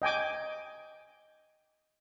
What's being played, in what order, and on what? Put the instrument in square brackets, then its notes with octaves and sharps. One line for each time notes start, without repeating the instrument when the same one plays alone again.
[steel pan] D#5 G5 G#5 D6